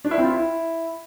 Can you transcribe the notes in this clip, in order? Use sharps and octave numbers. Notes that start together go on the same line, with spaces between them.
D4
E4
C4
F4
E4